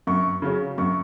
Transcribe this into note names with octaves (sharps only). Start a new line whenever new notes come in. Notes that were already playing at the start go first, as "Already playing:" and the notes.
F#2 C#6
C#3 F#3 C#4
F#2 C#6